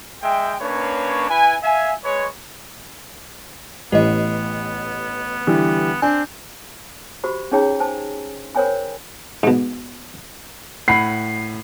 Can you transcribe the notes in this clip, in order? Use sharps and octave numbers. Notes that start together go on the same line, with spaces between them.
G#3 E5 G5
A#3 C#4 D4 B4 C#5
E4 B4 G#5
E5 F5 G#5
G#3 B4 C#5
A1 B3 G4 D#5
D3 E3 G3
C4 D4 G#5
F#4 G4 C5 B5
C#4 D#4 G#4 C#5 G5 A#5
C5 G#5 A5
A#4 C5 C#5 G5 G#5 B5
G#2 B2
A2 F#5 B5 C7